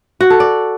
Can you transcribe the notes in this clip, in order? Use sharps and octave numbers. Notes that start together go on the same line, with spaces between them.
F#4
A4
D5